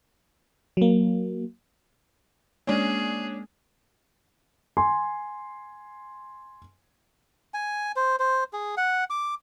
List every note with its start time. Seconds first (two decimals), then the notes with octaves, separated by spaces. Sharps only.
0.77 F#3 A#3
2.67 G#3 A#3 C#4 D4 G#4
4.77 G#5 C6
7.54 G#5
7.96 C5
8.20 C5
8.53 G#4
8.77 F#5
9.10 D6